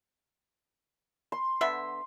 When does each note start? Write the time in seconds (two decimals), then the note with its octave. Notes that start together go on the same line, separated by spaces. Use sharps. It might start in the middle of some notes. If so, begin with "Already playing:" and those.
1.32 C6
1.61 D3 B3 E5